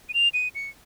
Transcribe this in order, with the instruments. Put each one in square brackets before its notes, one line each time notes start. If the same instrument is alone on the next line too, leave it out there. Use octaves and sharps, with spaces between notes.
[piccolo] D#7
F7
D#7
C#7